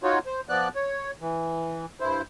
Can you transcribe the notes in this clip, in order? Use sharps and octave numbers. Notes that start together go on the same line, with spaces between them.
D#4 F4 F#4 C#5
C5
F3 B3 D5 F#6
C#5
E3
G2 E4 C5